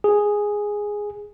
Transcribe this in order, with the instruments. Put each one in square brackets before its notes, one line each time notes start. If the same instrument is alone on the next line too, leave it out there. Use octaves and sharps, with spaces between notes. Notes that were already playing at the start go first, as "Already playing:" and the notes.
[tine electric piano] G#4